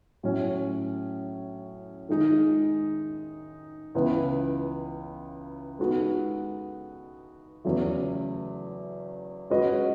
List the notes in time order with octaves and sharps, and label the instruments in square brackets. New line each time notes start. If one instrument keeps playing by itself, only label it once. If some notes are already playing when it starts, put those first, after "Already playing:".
[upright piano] A2 F#3 C#4
D#3 G#3 D#4
C#2 C#3 E3 B3
G#3 B3 D#4 F#4 A4
E2 C#3 F#3 A3
G#3 C#4 F#4 B4 D#5